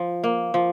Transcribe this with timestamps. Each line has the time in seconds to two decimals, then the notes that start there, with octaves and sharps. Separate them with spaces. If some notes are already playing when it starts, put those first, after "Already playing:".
Already playing: F3
0.24 A#3
0.54 F3